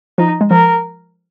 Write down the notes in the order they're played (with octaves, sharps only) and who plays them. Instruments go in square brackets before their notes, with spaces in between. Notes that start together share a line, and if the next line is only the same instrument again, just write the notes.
[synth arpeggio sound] F3 [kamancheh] D#4
[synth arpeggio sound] G#3
[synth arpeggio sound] F3 [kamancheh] A#4